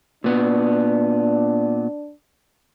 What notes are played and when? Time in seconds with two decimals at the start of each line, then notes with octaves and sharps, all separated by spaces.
0.24 A#2 B3 D4